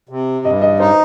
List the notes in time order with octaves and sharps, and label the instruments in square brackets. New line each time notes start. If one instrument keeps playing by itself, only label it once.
[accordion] C3
[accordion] G2 [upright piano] D#5
[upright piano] D#5
[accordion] D#4 [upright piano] C5